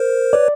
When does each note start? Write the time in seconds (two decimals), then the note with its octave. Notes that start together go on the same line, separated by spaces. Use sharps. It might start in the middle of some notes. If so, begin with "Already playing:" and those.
Already playing: A#4 C5
0.33 B4 C#5 D5